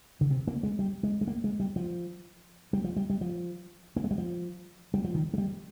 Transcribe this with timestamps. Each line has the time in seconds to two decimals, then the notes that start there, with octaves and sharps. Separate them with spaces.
0.21 D3
0.31 C3
0.47 A#3
0.63 G#3
0.79 G3
1.03 G#3
1.21 G#3
1.27 A#3
1.44 G#3
1.60 G3
1.76 F3
2.73 G3
2.84 F3
2.96 G3
3.10 G3
3.21 F3
3.96 A#3
4.04 G#3
4.11 G3
4.18 F3
4.94 G3
5.04 F3
5.15 D#3
5.34 G#3
5.38 G3